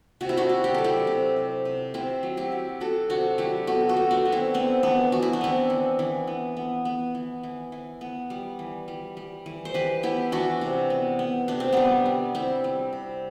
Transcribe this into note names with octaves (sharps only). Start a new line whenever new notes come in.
C3 F#4
E4
D4 F#4
C3
G4
F#3 A4
E4 G4
C3
C3
C3
C3 C4 E4
F#3
E4 G4
F#3
F#3 F#4 A4
C3 D4 F#4
F#3 E4 G4
B3 F#4 A4
F#4 A4
B3
D4 F#4
B3
C4 E4
B3 C4
E3 B3 D4
E3 F#4
E4
D4
B3 C4 E4
E3
E3
B3
B3
B3
E3
E3
E3
B3
G3
E3
G3
G3
E3
C5
E3 G4 B4
B3 E4 G4
E3 D4 F#4
C3
B3
B3
C3 D4
C4
G3 B3 D4
G3
G3 C4 E4
G3
C3